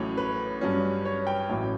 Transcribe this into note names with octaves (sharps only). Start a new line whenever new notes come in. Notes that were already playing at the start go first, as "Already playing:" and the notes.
Already playing: A1 A2 F#3 C#4 C#5
B4
G2 F#3 C#4
C#5
G5
A1 A2 F#3 C#4 E4